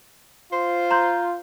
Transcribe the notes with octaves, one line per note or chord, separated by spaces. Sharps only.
F4 C5
A#5 C6 G6